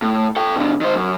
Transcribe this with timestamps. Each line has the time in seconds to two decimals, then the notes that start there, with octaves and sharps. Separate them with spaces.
0.02 A2
0.36 A4 G5
0.56 B2 D3
0.81 D#3 C5
0.95 F#2